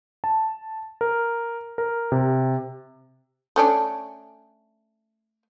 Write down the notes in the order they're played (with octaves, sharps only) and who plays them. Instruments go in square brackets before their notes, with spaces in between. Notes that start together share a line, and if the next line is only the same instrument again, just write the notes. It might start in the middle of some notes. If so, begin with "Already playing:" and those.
[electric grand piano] A5
A#4
A#4
C3
[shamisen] A3 C#4 D4